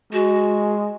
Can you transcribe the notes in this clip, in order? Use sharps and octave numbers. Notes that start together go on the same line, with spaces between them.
G#3 F#4